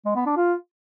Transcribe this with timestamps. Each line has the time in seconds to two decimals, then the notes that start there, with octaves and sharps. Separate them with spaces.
0.05 G#3
0.16 B3
0.26 D4
0.36 F4